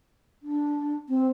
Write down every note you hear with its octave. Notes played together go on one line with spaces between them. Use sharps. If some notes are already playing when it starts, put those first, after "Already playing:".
D4
C4